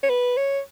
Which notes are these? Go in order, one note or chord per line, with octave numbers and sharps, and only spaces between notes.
C#5
B4
C#5